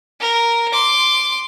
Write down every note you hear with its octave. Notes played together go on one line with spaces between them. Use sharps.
A#4
C6 D6